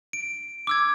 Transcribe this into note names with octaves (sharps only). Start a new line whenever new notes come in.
D7
D6 E6 G#6